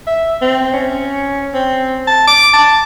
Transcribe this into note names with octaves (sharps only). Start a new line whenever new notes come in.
E5
C4
C#4
C4
A5
D6
A5